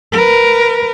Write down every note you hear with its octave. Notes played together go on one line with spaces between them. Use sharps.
A#4 B4